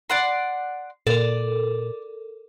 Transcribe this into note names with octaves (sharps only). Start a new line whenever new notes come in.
D5 F#5 C6
A#2 A4 A#4 D5